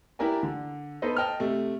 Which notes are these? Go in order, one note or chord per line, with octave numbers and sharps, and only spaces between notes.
D4 E4 G4 A#4 D5 G#5
D3
B3 D#4 A4 B4 C5 D#5
D#5 G5 A5 F6
C3 A3